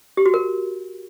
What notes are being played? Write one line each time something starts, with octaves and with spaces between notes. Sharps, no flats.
G4
F#4
A#4